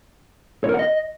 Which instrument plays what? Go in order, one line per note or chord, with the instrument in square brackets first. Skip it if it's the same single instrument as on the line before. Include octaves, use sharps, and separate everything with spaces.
[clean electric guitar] C#5
A#4
F#5
D#5